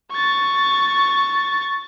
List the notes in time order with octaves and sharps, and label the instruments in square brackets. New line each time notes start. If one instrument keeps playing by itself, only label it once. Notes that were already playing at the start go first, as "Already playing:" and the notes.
[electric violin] C#6 A6